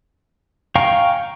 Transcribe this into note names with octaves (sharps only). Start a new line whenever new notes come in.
F5 G5 G#5 A#5 C#6